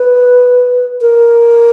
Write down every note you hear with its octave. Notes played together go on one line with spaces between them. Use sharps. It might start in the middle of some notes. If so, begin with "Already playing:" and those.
Already playing: B4
A#4